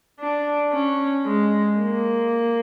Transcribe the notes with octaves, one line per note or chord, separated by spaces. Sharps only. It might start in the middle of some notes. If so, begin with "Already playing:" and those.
D4
C#4
G#3
A#3